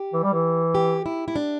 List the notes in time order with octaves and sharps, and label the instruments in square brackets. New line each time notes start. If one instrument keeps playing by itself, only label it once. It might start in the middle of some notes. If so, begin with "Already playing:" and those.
Already playing: [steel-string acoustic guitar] G4
[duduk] E3
G3
E3
[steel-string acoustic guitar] G4
E4
E4
D4